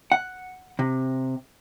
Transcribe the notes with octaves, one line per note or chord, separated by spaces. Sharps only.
F#5
C3